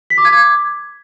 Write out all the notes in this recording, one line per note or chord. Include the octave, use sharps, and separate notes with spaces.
B6
D6
G#6
D6